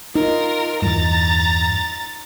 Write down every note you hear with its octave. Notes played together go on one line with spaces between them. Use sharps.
D#4 F4 A#4
E2 G2 A#5 A6